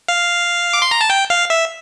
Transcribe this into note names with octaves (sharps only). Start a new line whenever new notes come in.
F5
D6
C6
A#5
A5
G5
F5
E5